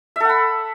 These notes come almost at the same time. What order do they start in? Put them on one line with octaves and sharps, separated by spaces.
E5 A4 F#5 B5